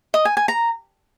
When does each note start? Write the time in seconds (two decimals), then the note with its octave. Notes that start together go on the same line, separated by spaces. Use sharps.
0.14 D#5
0.25 G#5
0.37 G#5
0.48 A#5